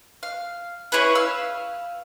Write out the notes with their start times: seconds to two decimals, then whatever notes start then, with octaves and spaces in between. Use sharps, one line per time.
0.23 F5
0.92 C#4 E4 G#4 B4
1.15 F5 E6